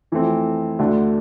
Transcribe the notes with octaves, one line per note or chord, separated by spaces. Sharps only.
F2 E3 A3 C4
D2 D3 A3 D4